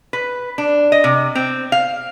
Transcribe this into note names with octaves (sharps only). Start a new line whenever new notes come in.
B4
D4
D#5
C3
C4
F5